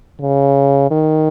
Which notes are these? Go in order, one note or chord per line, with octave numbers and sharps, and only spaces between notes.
C#3
D#3